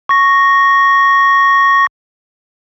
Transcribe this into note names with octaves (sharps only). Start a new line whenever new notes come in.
C#6 A#6